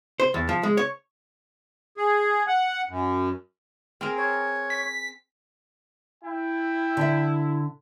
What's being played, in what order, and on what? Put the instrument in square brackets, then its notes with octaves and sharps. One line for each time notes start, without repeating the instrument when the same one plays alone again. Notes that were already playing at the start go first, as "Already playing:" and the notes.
[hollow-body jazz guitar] C5
E2
F3
G#3
C#5
[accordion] G#4
F#5
F#2
[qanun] C4 G#4 A#4
[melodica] C#5
[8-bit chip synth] B6
[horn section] E4 [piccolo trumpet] G5
[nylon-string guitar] D3 E5